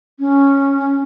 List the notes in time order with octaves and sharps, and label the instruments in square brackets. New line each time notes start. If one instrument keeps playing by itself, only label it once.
[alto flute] C#4